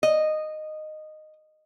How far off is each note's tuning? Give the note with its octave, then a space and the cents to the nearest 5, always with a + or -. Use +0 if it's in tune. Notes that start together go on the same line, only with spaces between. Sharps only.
D#5 -10